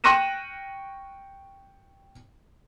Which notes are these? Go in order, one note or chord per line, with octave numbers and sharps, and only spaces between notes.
G5 C#6 F#6 A#6 D#7 E7